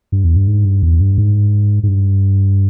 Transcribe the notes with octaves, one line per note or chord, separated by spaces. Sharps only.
G2
E2
G2
G#2
G2
E2
G2
G#2
G#2
G2